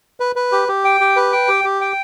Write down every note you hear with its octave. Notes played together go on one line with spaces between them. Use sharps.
B4
B4
G4
G4
G5
G4
B4
G5
G4
G4
G5